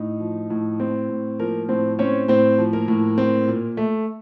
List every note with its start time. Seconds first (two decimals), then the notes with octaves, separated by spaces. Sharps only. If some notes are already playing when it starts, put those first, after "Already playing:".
Already playing: A2 D#4
0.20 F3
0.50 A2
0.80 C4
1.09 A2
1.39 F3 A#3 A#4
1.69 A2 C4 C5
1.99 C4 C#4 C#5
2.28 A2 C4 C5
2.58 F3
2.73 A#3 A#4
2.88 A2
3.18 C4
3.48 A#2
3.77 A3